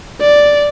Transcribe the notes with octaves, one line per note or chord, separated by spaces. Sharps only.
D5